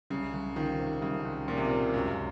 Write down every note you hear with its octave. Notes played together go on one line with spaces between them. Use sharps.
C2 C#3
C2
D#3 F3
C3
C2 C#3
C2
A#2 F3
C3
A#2
C3
C#2 F#2